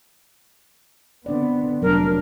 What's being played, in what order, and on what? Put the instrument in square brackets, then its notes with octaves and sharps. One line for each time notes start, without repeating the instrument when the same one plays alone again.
[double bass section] D3 B3 C4 [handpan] D4 D5
[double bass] F1 D4 [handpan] F#3 [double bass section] G3 [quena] A#4